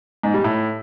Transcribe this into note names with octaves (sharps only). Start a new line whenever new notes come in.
G#2
G3
A2